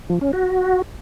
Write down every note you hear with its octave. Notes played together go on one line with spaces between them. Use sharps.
F3
C#4
F#4